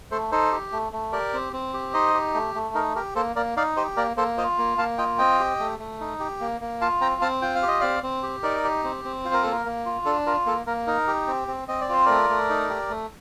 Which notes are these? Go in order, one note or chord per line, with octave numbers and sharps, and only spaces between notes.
A3 A4 C5
D#4 A4 C5
G4
A3
A3
G4 A#4 D5
C4
C4
G4
D#4 C5 D#5
G4
A3
A3
D#4 A#4
G4 A#4
A#3 A4 C5
A#3 A#4 D5
D#4 D5 F5
G4 C5 D#5
A#3 A#4 D5
A#3 A4 C5
F4 C5 D#5
A#3
A#3 F5 A5
F4 D#5 G5
C4 D#5 G5
G4
A3
A3
D#4
G4
A#3
A#3
F4 F5 A5
C4 G5 A#5
C4 F5 A5
F4 G5
F5
G4
D#5
C4 D5 F5
C4
G4
D#4 A#4 D5
G4
C4
C4
F4 C5
A#4
A#3 A4
A#4
A#3
F4
D4 A4
F4 A#4
A#3 A4
A#3 A#4
D#4 A#4
G4
C4
C4
C4 D#5
D5
F4 C5
A3 A#4 D5
A3
D#4
G4
A3